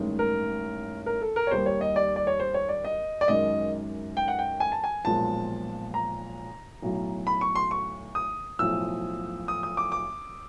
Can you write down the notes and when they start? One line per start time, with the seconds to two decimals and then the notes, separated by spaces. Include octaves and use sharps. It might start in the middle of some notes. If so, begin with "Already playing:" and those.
Already playing: A1 G2 D#3 G#3
0.19 A#4
1.06 A#4
1.22 A4
1.36 A#4
1.47 C#5
1.51 D#2 D#3 G3 A#3 C5
1.66 C#5
1.81 D#5
1.96 D5
2.16 D5
2.27 C#5
2.40 C5
2.54 C#5
2.69 D5
2.85 D#5
3.21 D5
3.28 F#2 D#3 G#3 D#5
4.17 G5
4.28 F#5
4.39 G5
4.60 G#5
4.72 A5
4.84 G#5
5.05 B1 A#2 F3 G#3 A5
5.94 A#5
6.82 B1 A2 F#3
7.27 B5
7.41 C#6
7.55 C6
7.71 C#6
8.15 D#6
8.59 B1 A2 F3 E6
9.48 D#6
9.63 D#6
9.77 D6
9.92 D6